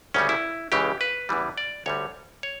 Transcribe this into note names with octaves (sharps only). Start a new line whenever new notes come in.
D2 C#3 G3 C#4
E4
C#2 C#3 E3 G4
B4
E2 C#3 E3 G3
D5
D2 D3 G3 C#5
C#5